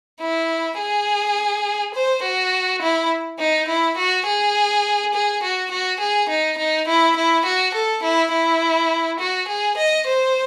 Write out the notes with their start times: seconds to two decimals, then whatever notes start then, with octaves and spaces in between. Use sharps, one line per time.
0.21 E4
0.79 G#4
1.95 C5
2.23 F#4
2.82 E4
3.39 D#4
3.68 E4
3.97 F#4
4.26 G#4
5.14 G#4
5.43 F#4
5.71 F#4
6.00 G#4
6.29 D#4
6.58 D#4
6.87 E4
7.16 E4
7.45 F#4
7.74 A4
8.03 E4
8.33 E4
9.19 F#4
9.48 G#4
9.78 D#5
10.07 C5